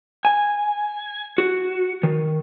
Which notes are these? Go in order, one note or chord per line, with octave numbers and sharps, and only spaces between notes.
G#5
F#4
D#3